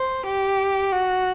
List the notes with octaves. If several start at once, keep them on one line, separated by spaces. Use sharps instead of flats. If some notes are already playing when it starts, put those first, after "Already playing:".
Already playing: C5
G4
F#4